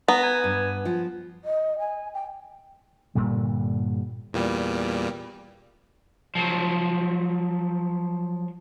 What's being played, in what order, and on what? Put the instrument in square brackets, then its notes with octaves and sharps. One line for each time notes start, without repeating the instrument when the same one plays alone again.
[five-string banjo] B3 [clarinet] A#5
[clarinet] G#5
[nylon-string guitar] G2
F3
[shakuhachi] D#5
G#5
G5
[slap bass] G1 A#2 D3 G3
[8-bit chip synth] E2 A#2 G3
[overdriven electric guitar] F3 F#3